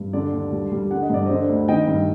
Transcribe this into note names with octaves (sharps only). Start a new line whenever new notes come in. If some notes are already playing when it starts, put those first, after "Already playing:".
Already playing: G2
D3 D5
D#2
G3
G3
D3 F#5
D#5
G2 D5
D3 C5 D#5
D2
D#3 D#5 G5
G2